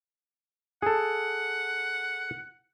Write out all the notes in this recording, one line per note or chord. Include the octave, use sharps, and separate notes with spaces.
G#4 A4 F#5